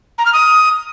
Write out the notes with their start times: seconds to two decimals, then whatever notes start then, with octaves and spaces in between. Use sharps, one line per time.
0.18 A#5
0.26 F6
0.33 D#6